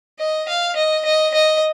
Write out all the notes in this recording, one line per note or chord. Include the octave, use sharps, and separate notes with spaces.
D#5
F5
D#5
D#5
D#5